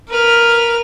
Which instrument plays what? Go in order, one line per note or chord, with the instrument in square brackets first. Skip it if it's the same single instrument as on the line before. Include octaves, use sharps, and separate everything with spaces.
[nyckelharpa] A#4 [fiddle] B4 F6